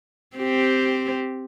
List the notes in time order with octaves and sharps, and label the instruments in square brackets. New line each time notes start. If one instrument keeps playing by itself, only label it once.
[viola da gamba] C4 G4